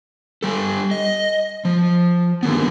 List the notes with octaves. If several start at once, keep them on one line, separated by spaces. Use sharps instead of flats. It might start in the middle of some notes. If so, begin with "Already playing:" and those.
G3 A4
D#5
F3
D3 D#3 B3